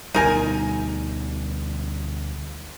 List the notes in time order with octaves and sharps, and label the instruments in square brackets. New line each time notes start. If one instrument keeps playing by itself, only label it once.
[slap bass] D2 B2 G3 [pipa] D#4 A#4 G#5